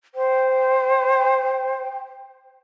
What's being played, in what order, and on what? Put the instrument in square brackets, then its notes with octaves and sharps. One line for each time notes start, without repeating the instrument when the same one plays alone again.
[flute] C5 [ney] G5